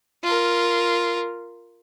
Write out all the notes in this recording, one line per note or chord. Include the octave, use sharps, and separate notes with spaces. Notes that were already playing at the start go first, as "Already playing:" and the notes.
F4 A#4